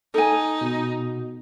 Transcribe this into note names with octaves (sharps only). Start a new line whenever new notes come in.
D#4 A4 G#5
B2